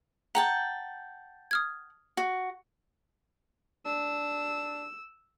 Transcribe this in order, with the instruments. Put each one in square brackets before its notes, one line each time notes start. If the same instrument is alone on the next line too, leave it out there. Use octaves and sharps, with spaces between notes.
[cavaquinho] F#5 G5 A5 [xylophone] A#5
[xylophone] D#6 F6 G#6
[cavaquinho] F#4
[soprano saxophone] D4 [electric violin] E6